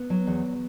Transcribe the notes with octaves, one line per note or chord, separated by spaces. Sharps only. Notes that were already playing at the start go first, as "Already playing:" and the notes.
Already playing: B3
F#3
E2